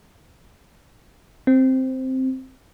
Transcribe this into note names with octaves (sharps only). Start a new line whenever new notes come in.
C4